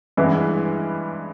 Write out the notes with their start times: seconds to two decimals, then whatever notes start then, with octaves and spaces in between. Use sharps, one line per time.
0.17 G2 E3 G#3 B3 E4